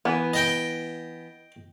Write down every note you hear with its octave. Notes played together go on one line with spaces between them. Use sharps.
E3 B3
D#5 G5